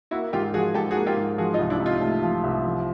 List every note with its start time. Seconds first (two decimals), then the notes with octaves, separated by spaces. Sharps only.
0.11 A#3 E4 F#4
0.33 G#2 F4 G4
0.54 F3 F#4 G#4
0.74 G#2 G4 A4
0.91 F#4 G#4
0.96 A#3
1.07 F4 G4
1.17 G#2
1.38 F3 F#4 G#4
1.54 D#4 F4
1.59 C2
1.70 D4 E4
1.80 C3
1.85 D#4 F4
2.01 A3
2.22 F3
2.43 C2
2.64 F3